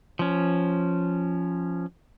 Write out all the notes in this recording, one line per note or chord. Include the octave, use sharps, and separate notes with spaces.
F3 C#4